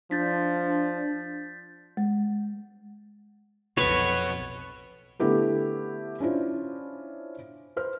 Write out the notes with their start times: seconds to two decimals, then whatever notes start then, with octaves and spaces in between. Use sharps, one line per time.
0.11 F3 D4 G6 A6 B6
1.97 G#3
3.77 B1 F2 B2 B3 B4 C#5 C#6
5.19 D3 A3 B3 E4 G4 B4
6.20 C#4 D4 E4 F4 C5
7.76 B4 C5 F6